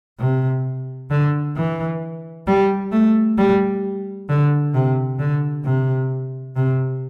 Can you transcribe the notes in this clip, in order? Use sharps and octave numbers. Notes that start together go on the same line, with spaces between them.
C3
D3
E3
G3
A3
G3
D3
C3
D3
C3
C3